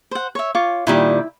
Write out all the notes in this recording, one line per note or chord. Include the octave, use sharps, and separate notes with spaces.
C5 F#5
C#5 E5
F4 C#5 D6
A#2 D#3 G3 E4